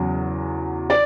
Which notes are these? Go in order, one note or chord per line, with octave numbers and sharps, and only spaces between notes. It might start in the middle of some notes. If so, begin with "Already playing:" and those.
Already playing: E2 C#3 F#3
D5